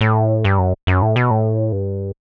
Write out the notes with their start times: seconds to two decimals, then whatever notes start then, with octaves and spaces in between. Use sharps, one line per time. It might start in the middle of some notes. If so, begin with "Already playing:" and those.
0.01 A2
0.45 G2
0.58 F#2
0.87 F#2
1.02 A2
1.16 B2
1.31 A2
1.72 G2